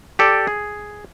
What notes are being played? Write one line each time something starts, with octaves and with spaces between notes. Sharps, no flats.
G4 A4 D5
G#4